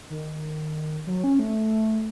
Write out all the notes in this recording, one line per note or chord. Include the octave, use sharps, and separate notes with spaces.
D#3
F#3
C#4
A3